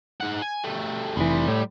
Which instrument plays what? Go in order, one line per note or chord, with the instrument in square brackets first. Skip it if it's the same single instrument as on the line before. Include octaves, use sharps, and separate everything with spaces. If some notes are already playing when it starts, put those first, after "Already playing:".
[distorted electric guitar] G#2 F#5
G#5
G3 A3
[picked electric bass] F1 E3 [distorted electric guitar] G3 C6
[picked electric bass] A2